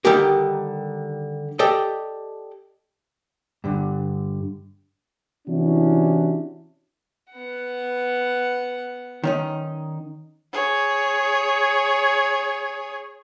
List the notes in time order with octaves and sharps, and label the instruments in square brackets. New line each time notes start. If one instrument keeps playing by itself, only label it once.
[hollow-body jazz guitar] D3 D#3 G3 D#4 G4 A#4
G4 A4 D5 D#5 G5
G2 D3
[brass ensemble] C3 E3 C#4 D4 E4 F#4
[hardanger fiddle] B3 F#5
[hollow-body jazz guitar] D#3 C#4 D#4
[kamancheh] G#4 C#5